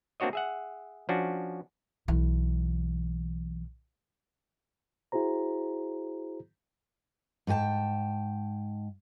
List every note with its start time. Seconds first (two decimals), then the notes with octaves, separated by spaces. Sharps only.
0.20 A#3 C4 D4 F#4 C#5 D#5
0.33 G#4 E5 F#5
1.09 F3 C#4 D4 F#4
2.08 B1 E3
5.12 E4 F#4 G#4 C5 A#5
7.47 G#2 F4 A4 G5 A5